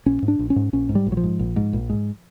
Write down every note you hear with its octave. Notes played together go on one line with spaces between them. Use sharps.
A#1 C#4
G#2
D4
A#1
C#4
G#2
A#1 C#4
G#2
G3
A#1
F#3
F3
G#2
A#1
G#2
A#1
G#2